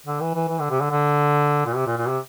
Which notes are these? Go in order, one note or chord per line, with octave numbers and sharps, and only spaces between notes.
D3
E3
E3
E3
D3
C3
D3
D3
A#2
C3
A#2
A#2
C3